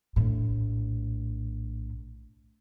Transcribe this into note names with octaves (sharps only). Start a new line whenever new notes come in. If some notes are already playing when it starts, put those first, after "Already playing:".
A#1 A2